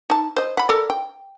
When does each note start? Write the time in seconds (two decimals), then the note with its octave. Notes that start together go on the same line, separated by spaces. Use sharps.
0.10 D#4 A5
0.36 C5 D#5
0.57 F#5 B5
0.69 A4 A#4 D5
0.90 G5